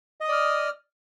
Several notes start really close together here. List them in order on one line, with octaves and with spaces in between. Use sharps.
D#5 D#6 D5 F6